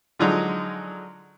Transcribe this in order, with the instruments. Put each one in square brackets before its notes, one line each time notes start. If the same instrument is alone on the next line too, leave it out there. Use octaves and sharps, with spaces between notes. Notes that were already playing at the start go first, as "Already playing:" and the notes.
[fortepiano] D3 F3 F#3 G#3 D#4